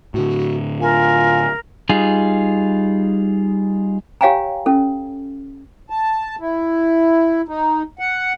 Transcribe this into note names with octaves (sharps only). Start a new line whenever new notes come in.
A2 D3 F#4
F4 A#4 G#5
G3 D#4 F4 G#4
G4 C#5 F5 G5 G#5 A#5
C#4 A4
A5
E4
D#4
F#5